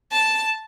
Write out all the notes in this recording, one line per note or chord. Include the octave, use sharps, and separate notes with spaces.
A5